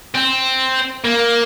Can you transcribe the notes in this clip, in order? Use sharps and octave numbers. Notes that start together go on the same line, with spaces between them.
C4
A#3